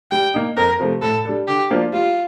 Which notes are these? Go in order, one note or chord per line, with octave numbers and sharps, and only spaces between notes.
G3 G5
A#3 D#4
F2 A#4
C3 F3 A3
A2 A4
G3 D4 A4
D3 G4
F3 A#3 D4 F4
G3 F4